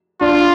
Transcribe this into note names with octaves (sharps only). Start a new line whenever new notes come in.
D4 F4